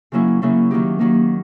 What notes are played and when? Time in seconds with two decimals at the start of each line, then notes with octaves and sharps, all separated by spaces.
0.12 C#3 F#3 A#3 C#4 E4
0.42 C#3 F#3 A#3 C#4 E4
0.71 D#3 F#3 A#3 D#4 G4
0.99 D#3 F#3 A#3 D#4 G4